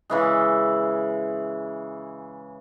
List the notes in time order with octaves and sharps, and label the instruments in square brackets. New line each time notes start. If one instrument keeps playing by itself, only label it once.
[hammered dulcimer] C#3 E3 G#3